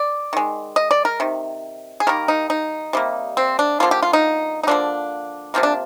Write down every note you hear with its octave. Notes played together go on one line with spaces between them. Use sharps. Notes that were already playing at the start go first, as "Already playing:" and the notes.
Already playing: D5
D#3 G#3
D#5
D5
A#4
C3 D#3
G#4
D#3 G3 A#3 A#4
D#4
D#4
C3 G3 A#3
C4
D4
D3 F3 A#3 F4
G4
F4
D#4
D#4
D3 F3 A#3 D4
C3 F3 A#3 C4
D4